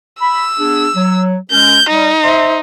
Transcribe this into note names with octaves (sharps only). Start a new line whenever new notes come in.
B5 E6
B3 D4 G#4
F#3
G#3 C#4 A#4 G6
G3 D#4
C5 E5 C6